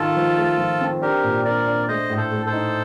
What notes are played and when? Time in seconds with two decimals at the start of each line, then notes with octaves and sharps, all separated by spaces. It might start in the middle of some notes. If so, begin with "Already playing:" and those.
Already playing: D#3 F4 A4
0.16 F3
0.37 A3
0.58 F3
0.81 C4
1.01 D4 G4 A#4
1.24 A#2
1.45 D4 A#4 D5
1.67 D4
1.88 A3 C5 D#5
2.10 A2
2.17 A4 C5
2.32 A3
2.46 A4 C5
2.53 D#4